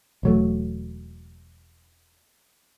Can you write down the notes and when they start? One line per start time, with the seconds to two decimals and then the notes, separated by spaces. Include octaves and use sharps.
0.23 E1 F#3 A3